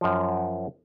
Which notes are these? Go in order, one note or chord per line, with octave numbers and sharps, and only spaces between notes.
F#2 F3